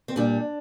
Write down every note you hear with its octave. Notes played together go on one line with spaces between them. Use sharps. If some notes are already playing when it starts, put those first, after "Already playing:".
C4
A#2 G3 D4